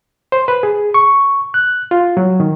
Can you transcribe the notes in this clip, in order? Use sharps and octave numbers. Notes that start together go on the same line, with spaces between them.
C5
B4
G#4
C#6
F#6
F4
F#3
D#3